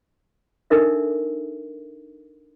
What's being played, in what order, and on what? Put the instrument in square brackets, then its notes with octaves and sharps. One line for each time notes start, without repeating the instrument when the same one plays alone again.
[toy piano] D4 D#4 A4 A#4 D5 E5